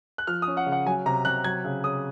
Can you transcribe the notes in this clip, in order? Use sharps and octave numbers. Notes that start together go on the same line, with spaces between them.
F#6
F3 F6
D#6
C#4
F#5
C#3
F#5
F#3 G#5
C3 A#5
C3 F#6
F#3 G#6
C#3
C#3 D#6